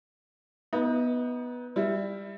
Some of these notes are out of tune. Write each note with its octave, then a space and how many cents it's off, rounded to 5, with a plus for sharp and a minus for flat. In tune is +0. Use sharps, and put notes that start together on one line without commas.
B3 -5 D#4 +30
G3 +15 E4 +0